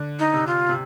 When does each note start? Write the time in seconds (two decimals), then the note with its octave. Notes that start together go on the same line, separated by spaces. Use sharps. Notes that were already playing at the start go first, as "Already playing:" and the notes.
Already playing: D3
0.19 D#4
0.33 C3
0.47 F4
0.69 C3